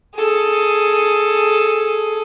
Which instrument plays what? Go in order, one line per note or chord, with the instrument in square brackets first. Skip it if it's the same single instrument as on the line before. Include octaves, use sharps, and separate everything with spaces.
[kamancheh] G#4 A4